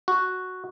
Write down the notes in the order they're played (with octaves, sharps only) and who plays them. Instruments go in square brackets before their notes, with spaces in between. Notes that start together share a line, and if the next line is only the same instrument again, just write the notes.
[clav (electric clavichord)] F#4